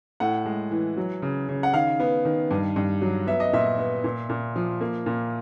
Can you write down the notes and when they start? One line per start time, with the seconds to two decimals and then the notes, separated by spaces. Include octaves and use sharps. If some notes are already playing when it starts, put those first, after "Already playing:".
0.20 A2 F#5
0.46 G#3
0.71 E3
0.97 F#3
1.22 C#3
1.48 C#3
1.63 F#5
1.74 D#3 F5
2.00 B3
2.25 D#3
2.51 G2
2.76 G2
3.02 F#3
3.27 B3 E5
3.40 D#5
3.53 A#2 E5
3.78 B3
4.04 A#2
4.29 A#2
4.56 F3
4.81 A#3
5.06 A#2